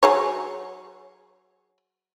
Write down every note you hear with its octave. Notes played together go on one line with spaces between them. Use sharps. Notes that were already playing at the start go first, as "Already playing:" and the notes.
F#3 G#4 C#5